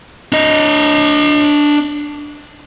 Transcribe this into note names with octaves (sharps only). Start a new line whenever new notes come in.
D4 D#5